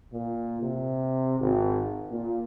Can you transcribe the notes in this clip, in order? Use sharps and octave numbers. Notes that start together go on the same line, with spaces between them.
A#2
C3
G#1
A#2